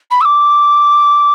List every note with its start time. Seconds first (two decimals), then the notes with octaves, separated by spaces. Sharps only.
0.11 B5
0.21 E6
0.25 D6